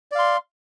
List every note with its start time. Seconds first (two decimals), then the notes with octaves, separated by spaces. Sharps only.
0.12 D5
0.15 F5
0.19 C6